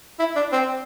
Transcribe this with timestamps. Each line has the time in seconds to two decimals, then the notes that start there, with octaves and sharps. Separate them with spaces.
0.20 E4
0.36 D4
0.53 C4